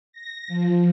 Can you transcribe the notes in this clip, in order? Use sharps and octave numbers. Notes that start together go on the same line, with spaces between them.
A#6
F3